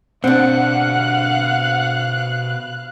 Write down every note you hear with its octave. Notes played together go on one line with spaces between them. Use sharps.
B2 C4 D4 G4 F5 F#5 F#6